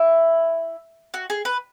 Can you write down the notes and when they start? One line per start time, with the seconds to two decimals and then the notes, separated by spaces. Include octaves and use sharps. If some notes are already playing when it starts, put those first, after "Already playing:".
Already playing: E4
1.14 F#4
1.30 G#4
1.45 B4